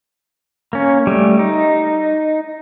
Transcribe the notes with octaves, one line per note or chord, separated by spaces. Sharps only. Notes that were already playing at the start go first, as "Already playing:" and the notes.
A#3 C#4
G3 A3
D#4